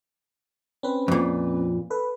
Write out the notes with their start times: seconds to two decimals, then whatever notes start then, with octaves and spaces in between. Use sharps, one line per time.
0.83 C4 C#4 B4
1.08 F2 A#2
1.90 A4 B4